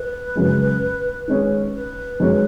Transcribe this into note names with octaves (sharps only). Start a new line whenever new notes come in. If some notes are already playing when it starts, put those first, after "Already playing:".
Already playing: B4
F#2 C#3 G#3
D#3 G#3 C#4 G#4
B4
F#2 D#3 G#3 C#4